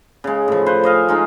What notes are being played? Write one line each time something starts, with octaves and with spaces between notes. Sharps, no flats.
C#3 G#3
A2 F3
B4 C5
C5 D#5 F5 G#5
G#3 D#4 F4